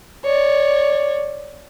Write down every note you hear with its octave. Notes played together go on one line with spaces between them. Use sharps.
C#5 D5